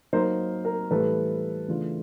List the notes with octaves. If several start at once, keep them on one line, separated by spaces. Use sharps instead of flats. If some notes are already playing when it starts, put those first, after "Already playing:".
F#3 A#3 D#4 A#4 C5
A#4
A2 E3 G3 A4 B4
C#3 E3 A3 D4 F4